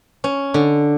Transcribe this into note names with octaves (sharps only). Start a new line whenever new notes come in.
C#4
D3